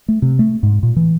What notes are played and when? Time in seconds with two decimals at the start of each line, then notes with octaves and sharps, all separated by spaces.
0.08 A3
0.22 C3
0.39 A3
0.63 G#2
0.83 A#2
0.96 E3